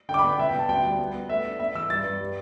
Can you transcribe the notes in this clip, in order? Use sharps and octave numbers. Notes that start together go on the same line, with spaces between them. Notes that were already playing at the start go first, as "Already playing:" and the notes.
D3 G5
D6
B5
B3 G5
B2 E5
G5
B2 A5
D2 G5
G3
B3
B3
A3 E5
D4
B3 E5
E2 E6
G2 A6
G2
G3